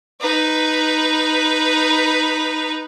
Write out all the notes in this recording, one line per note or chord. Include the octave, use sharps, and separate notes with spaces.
D#4 B4